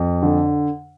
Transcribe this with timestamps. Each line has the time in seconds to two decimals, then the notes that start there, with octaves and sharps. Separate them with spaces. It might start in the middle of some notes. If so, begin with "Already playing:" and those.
Already playing: F2
0.23 D3